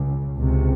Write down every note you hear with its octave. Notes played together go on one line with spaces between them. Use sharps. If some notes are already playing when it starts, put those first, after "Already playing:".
Already playing: C#2
C#2 C3